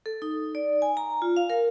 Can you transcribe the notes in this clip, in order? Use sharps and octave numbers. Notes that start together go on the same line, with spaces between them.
A4
D#4
D5
G#5
A#5
F4
F5
A#4